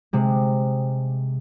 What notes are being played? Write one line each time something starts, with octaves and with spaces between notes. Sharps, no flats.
C3 G#3